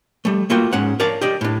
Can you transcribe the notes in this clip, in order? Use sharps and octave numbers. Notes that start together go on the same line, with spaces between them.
G3 A3
A3 A#3 F4 F#4 G5
G#2 G#3 C#4 F#5
A#4 C#5 D5 F5 A5
G4 D5 D#5
A2 D4